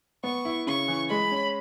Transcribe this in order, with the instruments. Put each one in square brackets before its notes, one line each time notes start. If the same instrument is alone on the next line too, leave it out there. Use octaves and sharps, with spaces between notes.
[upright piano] B3 [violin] C#6
[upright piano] E4
[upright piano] C#3 [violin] C#6
[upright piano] E3
[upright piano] G#3 [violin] B5
[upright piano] C#4